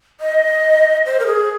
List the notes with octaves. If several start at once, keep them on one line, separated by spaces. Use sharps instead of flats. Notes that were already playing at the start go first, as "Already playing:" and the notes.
D#5
C5
A#4
G#4